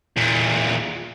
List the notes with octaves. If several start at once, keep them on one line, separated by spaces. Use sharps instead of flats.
E2 A#2